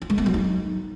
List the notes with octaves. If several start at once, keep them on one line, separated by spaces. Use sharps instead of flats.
F4
G#3
B3
F#3
D#4